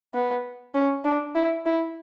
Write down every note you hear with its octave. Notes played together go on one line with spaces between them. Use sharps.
B3
C#4
D4
E4
E4